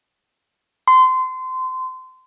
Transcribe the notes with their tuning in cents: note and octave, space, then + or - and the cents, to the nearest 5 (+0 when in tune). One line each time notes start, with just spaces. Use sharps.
C6 -25